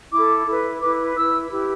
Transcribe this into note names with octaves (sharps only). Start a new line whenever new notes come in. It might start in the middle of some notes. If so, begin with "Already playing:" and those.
E4 A4 D6
E4 B4
E4 B4 D6
E4 B4 E6
E4 G4 B4